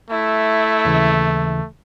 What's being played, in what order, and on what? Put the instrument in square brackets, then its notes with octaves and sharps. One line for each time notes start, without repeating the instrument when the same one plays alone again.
[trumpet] A3 [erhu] E4
[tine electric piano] D#2 C#3 E3